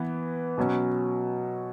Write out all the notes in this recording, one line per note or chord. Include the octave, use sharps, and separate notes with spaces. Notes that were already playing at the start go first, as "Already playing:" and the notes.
Already playing: E3 B3
B2 F#3 C#4